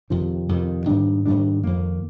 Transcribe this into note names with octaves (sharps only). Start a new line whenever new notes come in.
F2 C3 D#3
F2 C3 D#3
G#2 D#3 G3 D4
G#2 D#3 G3 D4
F2 D#3 A#3